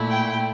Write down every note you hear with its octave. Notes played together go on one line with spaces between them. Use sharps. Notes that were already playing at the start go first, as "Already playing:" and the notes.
Already playing: A#2 A3 E4
G5